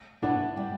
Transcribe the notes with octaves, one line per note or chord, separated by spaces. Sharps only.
B2 B3 D4 E4
G3 E4 G4